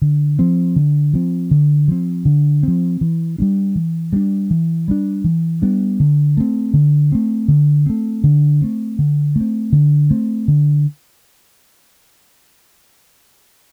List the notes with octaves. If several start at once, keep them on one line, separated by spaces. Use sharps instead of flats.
D3
F3 C4
D3
F3 C4
D3
F3 C4
D3
F3 C4
E3
G3 B3 D4
E3
G3 B3 D4
E3
G3 B3 D4
E3
G3 B3 D4
D3
A3 C4
D3
A3 C4
D3
A3 C4
D3
A3 C4
D3
A3 C4
D3
A3 C4
D3